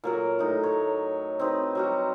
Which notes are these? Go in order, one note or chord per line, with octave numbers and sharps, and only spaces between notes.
A#2 F#3 A#4
A2 D#4
C#5
C4 D#4 B4
F#3 G3 F#4